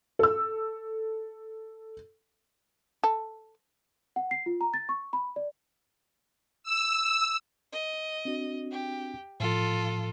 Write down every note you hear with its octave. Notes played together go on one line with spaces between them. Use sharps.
A4 E6
A4
F#5
C7
F4
A#5
A6
C#6
B5
D5
E6
E6
D#5
C4 D4 F#4
G4
A2 F3 F4 A4